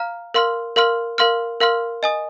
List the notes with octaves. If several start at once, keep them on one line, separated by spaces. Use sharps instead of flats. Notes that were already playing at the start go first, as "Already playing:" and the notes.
Already playing: F5 A#5 F6
A#4 F5 C6 F6
A#4 F5 C6 F6
A#4 F5 C6 F6
A#4 F5 C6 F6
D#5 G#5 D#6